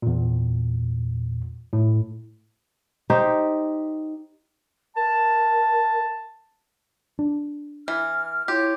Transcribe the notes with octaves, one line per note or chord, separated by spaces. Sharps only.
E2 A#2
A2
D#4 G4 C5
A#4 A5
D4
E3 F6
E4 F4 G4 C#5 C6